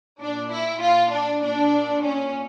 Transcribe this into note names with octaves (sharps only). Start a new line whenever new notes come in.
A#2 D4
E4
F4
D4
A#2 D4
C#4